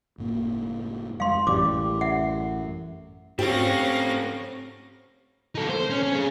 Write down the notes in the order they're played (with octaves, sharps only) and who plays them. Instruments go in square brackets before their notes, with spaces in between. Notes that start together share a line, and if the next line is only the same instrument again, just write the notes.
[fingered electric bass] F#1 A2 A#3
[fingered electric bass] F2 G3 G#3 [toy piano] F5 C6
[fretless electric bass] A1 G3 [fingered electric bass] F#2 [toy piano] D6
[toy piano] E5 F#5
[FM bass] G#2 [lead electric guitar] A3 C4 [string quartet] C#4 F5 A#6 [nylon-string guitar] G4
[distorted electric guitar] D#4 A4
C5
C#4
C#4
C#4 G#4